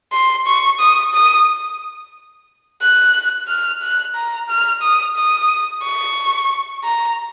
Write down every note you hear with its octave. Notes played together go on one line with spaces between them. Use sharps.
C6
C#6
D#6
D#6
F#6
F6
F#6
A#5
F6
D#6
D#6
C#6
A#5